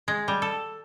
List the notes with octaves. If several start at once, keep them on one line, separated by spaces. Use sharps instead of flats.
G#3
G3
A4